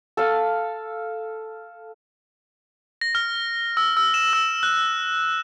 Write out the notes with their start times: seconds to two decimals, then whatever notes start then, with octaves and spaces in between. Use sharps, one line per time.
0.17 A4 F5
3.01 A#6
3.15 F6
3.77 E6
3.97 E6
4.14 E7
4.33 E6
4.63 F#6